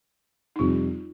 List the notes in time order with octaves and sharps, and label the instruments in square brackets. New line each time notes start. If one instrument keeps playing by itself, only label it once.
[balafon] D#4
[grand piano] F2 C3 G3 [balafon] F4